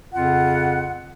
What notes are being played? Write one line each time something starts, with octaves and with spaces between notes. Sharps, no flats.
F2 C#3 F4 F#5